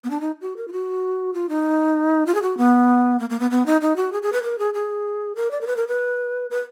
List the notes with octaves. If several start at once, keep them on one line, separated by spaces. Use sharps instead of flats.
B3
D4
D#4
F#4
A#4
F4
F#4
F4
D#4
F4
G#4
F#4
B3
A#3
A#3
B3
B3
D#4
D#4
F#4
G#4
G#4
B4
A#4
G#4
G#4
A#4
D5
A#4
B4
A#4
B4
B4